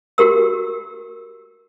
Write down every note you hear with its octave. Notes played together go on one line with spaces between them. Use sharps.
F#4 G4 A#4 E6